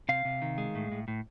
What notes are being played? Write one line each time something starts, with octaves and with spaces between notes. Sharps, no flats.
C3 F5
C3
D#3
G#3
A2
A2
A2